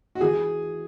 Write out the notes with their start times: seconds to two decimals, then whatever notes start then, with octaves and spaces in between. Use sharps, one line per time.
0.15 F#4
0.21 E3 G#4